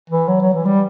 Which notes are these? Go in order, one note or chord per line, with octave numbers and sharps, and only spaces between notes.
E3
F#3
F#3
E3
G3